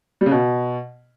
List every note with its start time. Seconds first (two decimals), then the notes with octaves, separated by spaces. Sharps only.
0.21 G3
0.26 C#3
0.31 B2